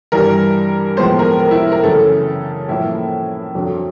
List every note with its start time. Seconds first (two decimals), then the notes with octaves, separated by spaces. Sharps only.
0.12 G2 E3 G3 A#4
0.97 A2 F3 G#3 B3 C5
1.19 A#4
1.40 A#4
1.51 E4
1.72 A#4
1.83 F#2 C#3 E3 A3 A4
2.68 A2 F3 A#3 E4
3.55 F2 D3 F#3